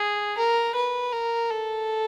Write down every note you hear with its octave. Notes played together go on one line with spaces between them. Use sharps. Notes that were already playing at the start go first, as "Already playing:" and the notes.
Already playing: G#4
A#4
B4
A#4
A4